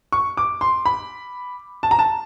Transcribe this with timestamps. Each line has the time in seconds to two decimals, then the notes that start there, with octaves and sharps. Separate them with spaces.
0.12 C#6
0.37 D6
0.61 C6
0.86 B5
1.83 A5
1.91 A#5
1.99 A5